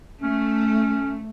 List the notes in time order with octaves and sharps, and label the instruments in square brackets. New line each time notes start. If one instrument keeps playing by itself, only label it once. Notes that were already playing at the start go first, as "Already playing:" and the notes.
[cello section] A3 [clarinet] C#4